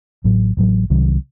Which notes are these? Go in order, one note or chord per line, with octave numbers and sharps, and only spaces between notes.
A1 A2 F#3
A1 A2 F#3
C2 C3 D#3 F#3